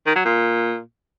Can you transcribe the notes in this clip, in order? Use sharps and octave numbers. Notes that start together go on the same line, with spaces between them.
D#3
F#3
A#2